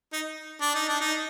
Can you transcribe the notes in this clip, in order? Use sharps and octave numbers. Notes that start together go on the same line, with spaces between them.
D#4
D4
D#4
D4
D#4